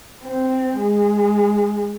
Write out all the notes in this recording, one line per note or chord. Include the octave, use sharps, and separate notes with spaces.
C4
G#3